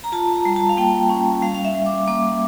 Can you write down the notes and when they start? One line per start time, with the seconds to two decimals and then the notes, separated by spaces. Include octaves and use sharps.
0.04 A#5
0.12 F4 A5
0.34 A#5
0.45 G3
0.56 A5
0.69 F5
0.77 A#3 G5
1.10 C#4
1.42 G3 F5
1.54 F5
1.65 E5
1.75 G3
1.86 D6
2.08 A#3 D6